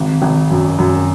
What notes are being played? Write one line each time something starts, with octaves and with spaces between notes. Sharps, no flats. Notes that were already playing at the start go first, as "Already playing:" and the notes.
Already playing: G#1
G#1
F#2
F#2